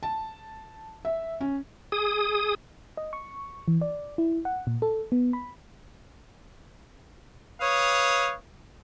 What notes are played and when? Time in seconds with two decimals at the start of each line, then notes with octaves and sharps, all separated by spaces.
0.03 A5
1.05 E5
1.41 C#4
1.92 G#4 D#6
2.97 D#5
3.13 C#6
3.68 E3
3.81 D5
4.18 E4
4.45 F#5
4.67 A#2
4.82 A4
5.12 B3
5.33 B5
7.61 B4 C#5 F5 D#6